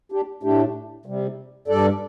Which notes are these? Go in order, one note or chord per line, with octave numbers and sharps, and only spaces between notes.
D4 G4
A2 A3 D4 G4
C3 G3
G2 G3 A4 D5